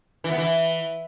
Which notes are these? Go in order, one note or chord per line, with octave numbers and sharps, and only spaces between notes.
E3
B3
E3